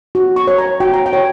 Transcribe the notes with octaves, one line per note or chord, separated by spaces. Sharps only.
F#4
C#6
C#5
A#5
F#4 G5
A#5
G5
C#5